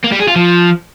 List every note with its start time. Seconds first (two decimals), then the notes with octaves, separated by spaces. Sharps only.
0.04 A#3
0.12 G3
0.20 G#4
0.28 F4
0.36 F3